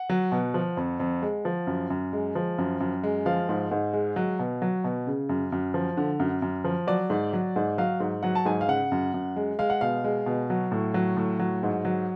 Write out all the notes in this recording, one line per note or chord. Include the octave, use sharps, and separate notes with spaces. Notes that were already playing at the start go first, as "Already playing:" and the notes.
Already playing: F#5
F#3
B2
F3
F2
F2
G#3
F3
F#2
F#2
G#3
F3
F#2
F#2
G#3
F3 F5
G#2
G#2
G#3
F#3
B2
F#3
B2
C#3
F#2
F#2
F3
D3
F#2
F#2
F3
F#3 D5
G#2
F#3
G#2
F#3 F5
G#2
F#3 F#5
A5
G#2 G#5
F5
C#3 F#5
F#2
F#2
G#3
G#3 F5
F#5
B2 F5
G#3
B2
F#3
A2
F#3
A2
F#3
G#2
F#3